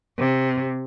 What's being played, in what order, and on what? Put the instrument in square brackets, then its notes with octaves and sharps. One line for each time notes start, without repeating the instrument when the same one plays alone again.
[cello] C3